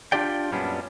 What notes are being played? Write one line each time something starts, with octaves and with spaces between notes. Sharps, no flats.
D4 F4 G4 D5 G5
F#2 A#2 G3 B3 C#4 D4